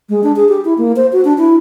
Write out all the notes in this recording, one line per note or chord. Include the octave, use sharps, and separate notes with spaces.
G#3
D4
G#4
G4
E4
A#3
C5
F#4
D4
E4